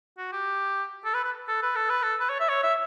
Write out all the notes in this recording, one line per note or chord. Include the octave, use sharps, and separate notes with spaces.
F#4
G4
A4
B4
B4
A4
B4
A4
B4
A4
B4
C#5
E5
C#5
E5